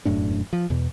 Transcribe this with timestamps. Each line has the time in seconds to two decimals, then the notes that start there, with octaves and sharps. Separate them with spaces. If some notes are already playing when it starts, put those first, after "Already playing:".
0.05 E1 F#2 A2 D4
0.53 F3
0.70 E2 B2